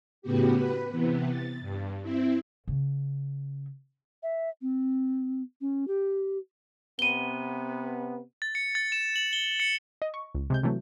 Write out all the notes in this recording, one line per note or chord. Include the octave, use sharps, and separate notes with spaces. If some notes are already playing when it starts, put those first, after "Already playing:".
A2 C#3 B3 F#4 G4
B4
C3 E3 B3
A6
G2
C4 E4
C#3
E5
C4
C#4
G4
C3 B3 D#7 G7
A6
C#7
A6
E7
F#7
G7
C#7
D#5
C#6
C#2
C3 G#3 G6
C3 E3 F#3 A3